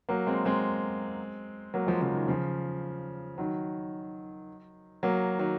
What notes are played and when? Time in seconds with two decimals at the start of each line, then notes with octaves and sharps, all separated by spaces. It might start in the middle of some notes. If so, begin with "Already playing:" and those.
0.09 F#3 A#3
0.27 G#3 C4
0.45 G#3 C4
1.74 F#3 A#3
1.87 F3 G#3
2.01 C#3 F3
2.15 D#3
2.28 C#3 F3
3.38 D#3 F#3
5.03 F#3 A#3
5.39 D#3 F#3